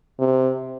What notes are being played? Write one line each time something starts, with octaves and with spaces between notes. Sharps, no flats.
C3